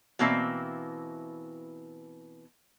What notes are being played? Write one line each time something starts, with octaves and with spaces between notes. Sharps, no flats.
B2 E3 A#3 C4 E4 E5